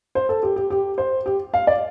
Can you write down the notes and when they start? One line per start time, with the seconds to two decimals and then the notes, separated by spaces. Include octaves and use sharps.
0.15 C5
0.29 A4
0.43 G4
0.56 G4
0.70 G4
0.98 C5
1.26 G4
1.54 F5
1.67 D5